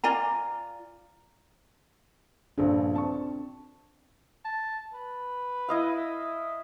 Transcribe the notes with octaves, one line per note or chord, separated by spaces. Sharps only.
F4 D5 G#5 A#5
A#1 G2 C#3 D4 A4
C4 A5 C#6
A5
B4
E4 D#5 F5
E5